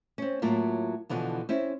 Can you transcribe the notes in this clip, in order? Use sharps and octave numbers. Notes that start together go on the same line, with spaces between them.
C4 C#4
A2 F#3 A#3 E4 F4
B2 D3 E3 F3
C4 C#4 E4